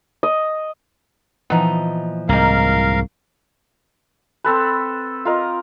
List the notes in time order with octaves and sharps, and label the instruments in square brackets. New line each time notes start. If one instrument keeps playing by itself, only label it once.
[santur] D#5
[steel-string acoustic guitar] A#2 E3 F3 [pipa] B3 D#4
[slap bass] C2 G#2 [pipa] D#3 A#3 [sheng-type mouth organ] A#4 F5
[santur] C4 A4 B4
F4 A#4 D#5